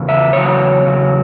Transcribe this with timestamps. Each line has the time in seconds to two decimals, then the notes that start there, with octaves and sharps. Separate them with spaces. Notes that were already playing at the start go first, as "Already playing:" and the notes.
Already playing: E2 C#3
0.09 E5
0.33 E2 C#3 F#3 C#5
0.84 E2 C#3 F#3